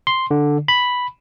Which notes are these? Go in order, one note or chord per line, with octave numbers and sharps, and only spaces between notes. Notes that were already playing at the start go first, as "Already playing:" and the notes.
C6
D3
B5